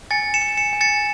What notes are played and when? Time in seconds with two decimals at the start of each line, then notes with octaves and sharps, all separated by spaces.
0.11 G#5 A6 C#7
0.34 C#7 E7
0.41 G#5
0.57 C#7 E7
0.73 G#5
0.81 A6 C#7